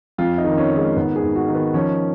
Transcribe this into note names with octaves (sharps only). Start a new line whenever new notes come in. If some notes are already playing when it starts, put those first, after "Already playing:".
F2 F4
D#4
D#3
C#4
D#3
G#3
G#2 B3
G#4
G#2
F#4
D#3
B3
F3 C#4